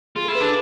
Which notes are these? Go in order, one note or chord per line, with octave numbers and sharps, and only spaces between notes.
F4 G#4
A4
E4
B4
D4 G#4